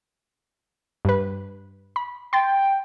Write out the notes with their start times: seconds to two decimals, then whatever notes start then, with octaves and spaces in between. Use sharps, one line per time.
1.05 G2 B4
1.96 B5
2.33 G5 C6 A6